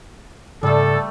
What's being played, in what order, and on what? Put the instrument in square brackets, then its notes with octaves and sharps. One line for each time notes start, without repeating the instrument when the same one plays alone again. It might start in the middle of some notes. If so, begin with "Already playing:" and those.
[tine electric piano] G#2 C#3 [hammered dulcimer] G3 A3 [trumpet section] A4